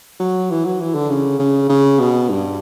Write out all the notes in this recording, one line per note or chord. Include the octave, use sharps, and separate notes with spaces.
F#3
E3
F#3
E3
D3
C#3
C#3
C#3
B2
G2